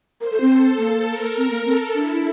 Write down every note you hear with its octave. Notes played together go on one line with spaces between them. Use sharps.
A#4 C5
A4
C4
A4
A#3 A4
A#4
C4
A#3
C4 A4
D4 E4